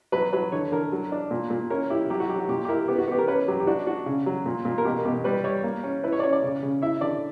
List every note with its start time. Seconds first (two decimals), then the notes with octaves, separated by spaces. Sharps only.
0.12 F#3 B4
0.33 F#3 B4
0.52 D3 C#5
0.72 D3 A#4
0.92 F#3
1.12 D4
1.31 A#2
1.50 A#2
1.70 C#4 A#4
1.90 E4 G4
2.10 F#3 G4
2.20 F#4
2.29 F#3 G4
2.39 F#4
2.48 A#2 G4
2.65 G4
2.69 E4 A#4
2.88 B3 G4
2.98 F#4
3.08 B3 G4
3.19 A#4
3.28 C#4 B4
3.48 F#3 G4
3.60 G4
3.67 D4 F#4
3.87 D4 F#4
4.06 C#3
4.26 F#3
4.46 A#2
4.65 A#2
4.78 A#4
4.85 B2 G4
4.98 A#4
5.05 B2 G4
5.24 G3 B4
5.44 G3 C#5
5.64 A#3
5.83 C#4
6.03 E4 B4
6.12 C#5
6.19 D5
6.23 C#4 C#5
6.33 D5
6.43 C#3
6.63 C#3
6.82 E4 E5
7.01 D3 D5